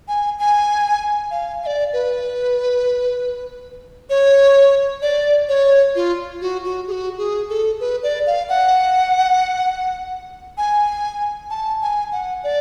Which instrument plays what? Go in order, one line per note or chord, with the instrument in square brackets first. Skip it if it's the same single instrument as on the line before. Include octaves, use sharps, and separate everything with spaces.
[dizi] G#5
G#5
F5
F5
D5
B4
C#5
D5
C#5
F4
F#4
F#4
G#4
F#4
G#4
A4
B4
D5
F5
F#5
G#5
A5
G#5
F#5
D5